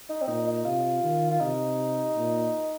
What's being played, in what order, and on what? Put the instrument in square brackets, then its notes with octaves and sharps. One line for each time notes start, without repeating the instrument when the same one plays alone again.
[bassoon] D#4
C4
[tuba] A#2 [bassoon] D#4
[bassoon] D#4
[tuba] C3 [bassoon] F4
[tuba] D#3
[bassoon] F4
[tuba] C3 [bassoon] D#4
[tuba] A#2